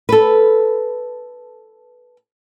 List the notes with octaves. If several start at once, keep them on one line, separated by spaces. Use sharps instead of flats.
A4 B4